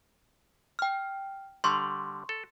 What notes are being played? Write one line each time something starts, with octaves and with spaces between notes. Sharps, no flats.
G5 F6
D3 G3 C6 C#6
A4